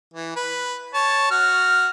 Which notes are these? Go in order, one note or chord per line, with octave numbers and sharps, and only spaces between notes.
E3
B4
C#5 A5
F#4 F6